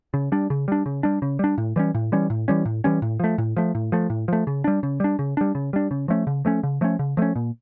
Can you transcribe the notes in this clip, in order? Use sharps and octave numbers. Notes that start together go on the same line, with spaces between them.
C#3
G3 D4
C#3
G3 D4
C#3
G3 D4
C#3
G3 D4
A2
E3 G3 C#4
A2
E3 G3 C#4
A2
E3 G3 C#4
A2
E3 G3 C#4
A2
F3 A3
A2
F3 A3
A2
F3 A3
A2
F3 A3
C#3
G3 D4
C#3
G3 D4
C#3
G3 D4
C#3
G3 D4
C#3
F3 A3 C#4
C#3
F3 A3 C#4
C#3
F3 A3 C#4
C#3
F3 A3 C#4
A#2